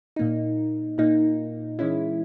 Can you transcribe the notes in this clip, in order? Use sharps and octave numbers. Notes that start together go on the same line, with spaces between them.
A#2 A#3 D#4
A#2 A#3 D#4
E3 G#3 C#4 E4